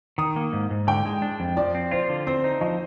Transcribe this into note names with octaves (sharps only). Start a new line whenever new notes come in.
D#3 D#6
A#3
G#2
G#2
D3 G5
G#3
D4
F2
F3 D5
C4
F4 C5
D3
C4 C5
D#4
F3 D#5